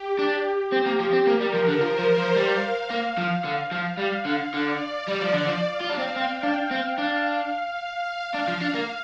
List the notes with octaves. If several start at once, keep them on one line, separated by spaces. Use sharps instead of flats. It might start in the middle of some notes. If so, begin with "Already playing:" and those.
Already playing: G4
D4
C4
A#3
F3
C4
A#3 A#4
G3
F3
D3
F3 C5
F3
F3
G3 F5
A#3
F3
D3 F5
F3
G3
D3
D3 D5
G3
F3
D3
F3
F5
F4
D4
C4
C4 G5
D4
C4 F5
D4
D4 F5
F3
D4
A#3